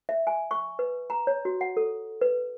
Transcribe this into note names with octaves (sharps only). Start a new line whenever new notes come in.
E5
G#5
C#6
B4
A#5
C#5
F#4
F#5
A4
B4